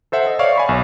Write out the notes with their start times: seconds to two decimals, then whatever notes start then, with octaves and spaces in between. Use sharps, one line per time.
0.12 A4 C5 E5 F#5
0.27 D#5
0.39 C#5 D5 F5 C#6
0.56 G#5 B5 C#6
0.69 B1